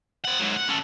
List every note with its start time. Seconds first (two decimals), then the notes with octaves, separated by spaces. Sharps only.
0.24 C4 F#5
0.40 G#2 F#3
0.56 F#5
0.69 C#4 A4